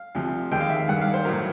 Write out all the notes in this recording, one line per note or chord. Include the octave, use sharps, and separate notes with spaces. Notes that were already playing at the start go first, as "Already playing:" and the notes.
Already playing: F5
D2 C3 F3
D#2 D#3 G#3 G5
F5
E5
F5
G2 D#3 G3 F#5
F5
C5
A2 F#3 A#4